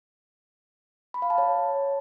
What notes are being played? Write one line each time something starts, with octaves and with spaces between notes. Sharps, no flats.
B5
F5
A5
C#5